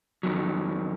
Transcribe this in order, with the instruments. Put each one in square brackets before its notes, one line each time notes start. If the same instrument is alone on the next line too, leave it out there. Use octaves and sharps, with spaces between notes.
[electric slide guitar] F2 D#3 F#3